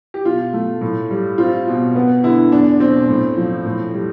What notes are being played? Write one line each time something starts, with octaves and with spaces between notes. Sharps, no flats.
G4
B2 F4
A3
A2
G3
C4 F4
B2
B3
D3 E4
E2 D4
B2 C4
A2
F3
A2
G3